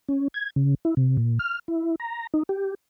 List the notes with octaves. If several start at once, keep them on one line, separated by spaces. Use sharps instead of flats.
C#4
G#6
C#3
E4
C3
A#2
F6
E4
A#5
D#4
G4